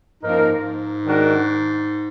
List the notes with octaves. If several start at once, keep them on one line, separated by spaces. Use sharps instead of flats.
G#2 F3 A#3 D#4 A#4
F#2
G#2
D#3 G#3 D4 F#4 A#4